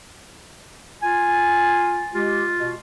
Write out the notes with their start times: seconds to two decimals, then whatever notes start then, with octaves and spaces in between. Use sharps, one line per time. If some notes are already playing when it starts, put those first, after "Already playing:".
1.02 F4 G#5
2.14 G#3 F4 G4
2.58 B2